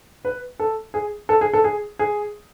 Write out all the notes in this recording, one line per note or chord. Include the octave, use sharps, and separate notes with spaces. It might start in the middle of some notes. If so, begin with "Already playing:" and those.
B4
A4
G#4
A4
G#4
A4
G#4
G#4